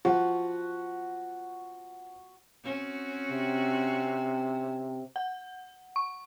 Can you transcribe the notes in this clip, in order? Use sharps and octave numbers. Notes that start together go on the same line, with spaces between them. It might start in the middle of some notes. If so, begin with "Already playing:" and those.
F3 F#4
C4 C#4 F#4
C3
F#5
C#6